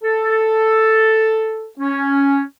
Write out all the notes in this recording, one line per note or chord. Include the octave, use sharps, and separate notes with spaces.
A4
C#4